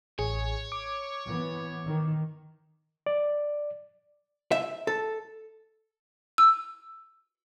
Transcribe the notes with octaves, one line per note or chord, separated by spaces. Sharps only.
A1 G#4 C#5
D6
E3 B3
D#3
D5
E5
A4
E6